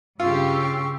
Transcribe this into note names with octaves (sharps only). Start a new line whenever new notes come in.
G2 C#3 F4 G4 C6 C#6 E6